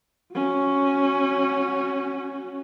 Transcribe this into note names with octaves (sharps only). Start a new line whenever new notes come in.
C#4 F#4